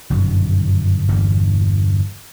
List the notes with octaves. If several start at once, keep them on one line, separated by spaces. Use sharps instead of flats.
G1 F#2 B2 D#3
G1 E2 G2 A#2